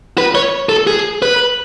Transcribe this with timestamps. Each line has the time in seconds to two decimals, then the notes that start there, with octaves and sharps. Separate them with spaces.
0.18 B4
0.35 C#5
0.69 A4
0.87 G#4
1.22 B4